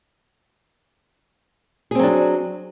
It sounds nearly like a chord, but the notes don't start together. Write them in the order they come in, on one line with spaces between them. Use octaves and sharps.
G#4 C4 F#3 D4